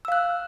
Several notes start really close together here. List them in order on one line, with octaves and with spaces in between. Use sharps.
E6 F5 F#6